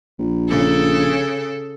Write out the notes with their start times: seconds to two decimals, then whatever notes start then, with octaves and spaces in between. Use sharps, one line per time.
0.19 A#1
0.49 C#3 A4